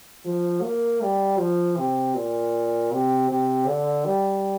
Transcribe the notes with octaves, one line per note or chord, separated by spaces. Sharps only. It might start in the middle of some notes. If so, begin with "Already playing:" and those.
F3
A#3
G3
F3
C3
A#2
C3
C3
D3
G3